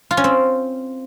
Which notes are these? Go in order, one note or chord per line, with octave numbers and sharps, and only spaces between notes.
F4
C#4
C4